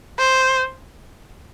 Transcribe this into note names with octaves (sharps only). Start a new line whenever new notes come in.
C5